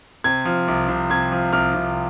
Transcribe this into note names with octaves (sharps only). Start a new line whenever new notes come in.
C3 G#6
F3
C2
C2
C3 G#6
F3
C2 F6
C2